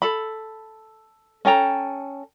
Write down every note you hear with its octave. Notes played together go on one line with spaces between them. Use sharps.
A4 B5
C#4 A4 G5 A#5